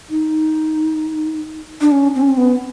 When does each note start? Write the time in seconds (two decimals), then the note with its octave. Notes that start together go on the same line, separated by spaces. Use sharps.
0.10 D#4
1.81 D4
1.92 C#4
2.15 C4
2.22 C#4
2.29 C4
2.38 B3